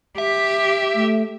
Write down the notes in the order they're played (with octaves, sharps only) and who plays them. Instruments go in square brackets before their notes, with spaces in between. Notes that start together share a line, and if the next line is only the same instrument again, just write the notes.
[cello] G4 [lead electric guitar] E5
[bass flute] A3